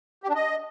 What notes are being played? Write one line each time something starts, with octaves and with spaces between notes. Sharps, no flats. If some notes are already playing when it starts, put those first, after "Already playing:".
G4
D4
D#5